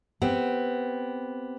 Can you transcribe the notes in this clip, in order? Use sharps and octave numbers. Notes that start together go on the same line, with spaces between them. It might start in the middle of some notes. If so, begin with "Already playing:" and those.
B3 C4 G4